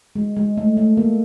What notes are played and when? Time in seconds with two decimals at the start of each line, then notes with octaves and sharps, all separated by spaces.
0.15 G#3
0.37 G#3
0.57 A3
0.77 A3
0.97 A#3